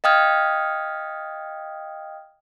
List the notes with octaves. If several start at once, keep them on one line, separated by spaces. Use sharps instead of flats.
D#5 F5 G5 D#6 F6 G#6